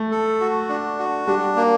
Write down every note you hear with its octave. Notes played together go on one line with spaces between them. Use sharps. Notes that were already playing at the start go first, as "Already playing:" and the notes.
Already playing: A3
A4
F#4
D4
F#4
G3 D4
A#3